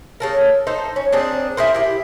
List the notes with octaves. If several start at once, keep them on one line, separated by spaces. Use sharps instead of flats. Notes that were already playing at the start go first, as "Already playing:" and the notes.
C#3 A4 A#4
D#4 A4 C5
C#4
C4 D4 D#4 G#4
E4 G#4 A#4 C5
E4 G4